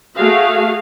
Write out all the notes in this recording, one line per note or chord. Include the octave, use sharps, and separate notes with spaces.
A3 F#4 G#4 F5